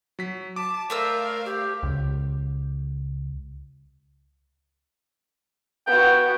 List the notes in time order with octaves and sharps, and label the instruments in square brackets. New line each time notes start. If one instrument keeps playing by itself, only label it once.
[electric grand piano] F#3 B6
[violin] A5 [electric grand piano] D6
[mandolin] A3 C5 E6 [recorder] A#4 [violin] D5 F5
[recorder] G4
[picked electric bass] C#2
[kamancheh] B3 F#4 [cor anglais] G5